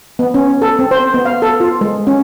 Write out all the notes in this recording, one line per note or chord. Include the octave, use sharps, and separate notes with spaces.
B3
C#4
A4
C4
C5
B3
F5
A4
F4
G#3
C#4